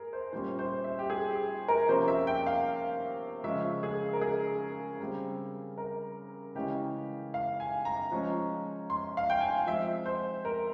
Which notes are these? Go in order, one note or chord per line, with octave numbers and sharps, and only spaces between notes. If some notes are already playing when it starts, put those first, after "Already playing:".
Already playing: G#4 A#4
C5
A#2 G3 C#4 C5
C5
E5
G4
G#4
G4
A#4
C3 F3 A#3 C#4 C5
E5
G5
F5
C#3 F3 G#3 C#4 E5
G#4
A#4
G#4
C#3 G3 C4
A#4
C#3 E3 G#3 C#4 G4
F5
G#5
A#5
F3 G#3 C#4
C6
F5
G5
G#5
F3 G#3 C4 E5
C5
A#4